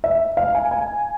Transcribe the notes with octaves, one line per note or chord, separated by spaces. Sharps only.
E5
F5
G#5
G#5